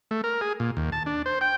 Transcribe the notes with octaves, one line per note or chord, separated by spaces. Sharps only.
A3
A#4
G#4
A#2
D#2
A5
D4
C5
G5